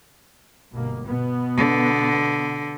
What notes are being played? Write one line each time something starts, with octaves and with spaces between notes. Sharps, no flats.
G1 B2 A#3
B2 B3
D3